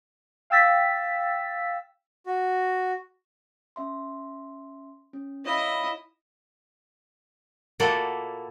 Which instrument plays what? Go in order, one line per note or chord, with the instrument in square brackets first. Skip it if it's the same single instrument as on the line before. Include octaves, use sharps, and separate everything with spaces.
[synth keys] F5 G5 E6 A6 B6
[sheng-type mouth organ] F#4
[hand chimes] C#4 E5 C6
C#4
[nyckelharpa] E4 D#5 [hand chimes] C#5 F5 B5
[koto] A#2 A#3 E4 F#4 A4 D5